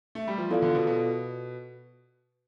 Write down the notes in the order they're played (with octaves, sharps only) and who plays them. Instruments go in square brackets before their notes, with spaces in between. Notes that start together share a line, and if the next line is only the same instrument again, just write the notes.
[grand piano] A3
G3
F3
[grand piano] E3 [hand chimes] B3 F4 A4 D5 F5
[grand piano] D3
B2
B2